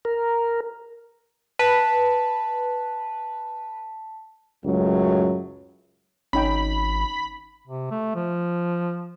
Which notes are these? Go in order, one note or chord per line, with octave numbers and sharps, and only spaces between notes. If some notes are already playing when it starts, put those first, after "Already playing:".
A#4
B4 A5 B6
C#2 F#2 A2 F#3
G#1 C#4 D#4 G5 B5
C3
A3
F3